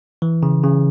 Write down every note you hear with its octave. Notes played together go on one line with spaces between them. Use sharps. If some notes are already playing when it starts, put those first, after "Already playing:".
E3
C#3
C#3